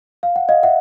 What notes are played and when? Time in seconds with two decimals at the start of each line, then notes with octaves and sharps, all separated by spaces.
0.23 F5
0.36 F#5
0.49 D#5 F5
0.63 E5 F#5